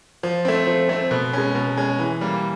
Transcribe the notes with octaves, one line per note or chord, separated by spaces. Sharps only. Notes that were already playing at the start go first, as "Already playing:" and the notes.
F3
A3 C4
F3
A3 C4
B2
G#3 C#4
B2
G#3 C#4
E3
G3 A#3